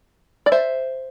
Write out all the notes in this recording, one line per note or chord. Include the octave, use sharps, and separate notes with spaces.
D5
C5 E5